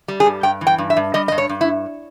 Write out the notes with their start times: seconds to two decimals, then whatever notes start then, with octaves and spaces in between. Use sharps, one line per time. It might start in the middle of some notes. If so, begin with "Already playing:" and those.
0.08 G3
0.20 G#4
0.26 G2
0.43 G2 G5
0.61 E3
0.67 G5
0.78 G2
0.90 E5
0.97 G2
1.14 G3 D#5
1.28 G2 D#5
1.38 C#5
1.49 G2
1.61 E4